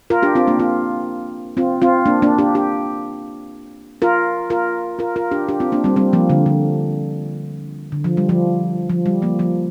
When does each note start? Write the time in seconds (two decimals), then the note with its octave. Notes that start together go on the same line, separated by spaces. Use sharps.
0.10 F4 A#4
0.23 D4 G4
0.35 C4 F4
0.47 A#3 D4
0.59 C4 F4
1.57 C4 F4
1.82 C4 F4
2.06 A#3 D4
2.22 A#3 D4
2.38 D4 G4
2.55 D4 G4
4.02 F4 A#4
4.50 F4 A#4
4.99 F4 A#4
5.16 F4 A#4
5.31 D4 G4
5.49 D4 G4
5.60 C4 F4
5.72 A#3 D4
5.84 G3 C4
5.96 G3 C4
6.13 F3 A#3
6.30 D3
6.46 D3
7.92 D3
8.04 F3
8.17 G3
8.29 F3
8.90 F3
9.06 G3
9.22 F3 A#3
9.39 F3 A#3